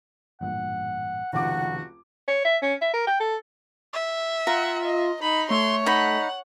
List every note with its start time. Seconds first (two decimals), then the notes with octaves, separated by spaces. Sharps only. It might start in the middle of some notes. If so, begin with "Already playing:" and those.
0.41 A1 G2 A#2 F#5
1.33 F1 C#2 D#3 F#4 F#5 D6
2.28 C#5
2.45 E5
2.62 C#4
2.81 E5
2.93 A#4
3.07 G5
3.20 A4
3.93 E5
4.47 F4 F#5 A#5
4.84 D#5
5.22 D#4 B5
5.50 A3 C#5 C6
5.86 D#4 F#5 B5